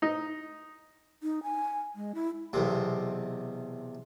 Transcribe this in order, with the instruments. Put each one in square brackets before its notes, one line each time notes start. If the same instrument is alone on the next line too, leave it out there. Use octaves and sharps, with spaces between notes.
[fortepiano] D#4
[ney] D#4
G#5
G#3
E4
[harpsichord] B1 E2 C3